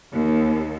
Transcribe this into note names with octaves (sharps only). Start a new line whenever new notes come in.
D#2